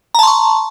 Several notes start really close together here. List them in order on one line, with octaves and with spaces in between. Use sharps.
A#5 A5 C6 C#6